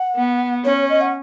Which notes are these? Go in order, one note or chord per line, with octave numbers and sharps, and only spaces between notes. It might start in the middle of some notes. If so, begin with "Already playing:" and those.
Already playing: F#5
B3
C#4 C#5
C#5
D#5
F#5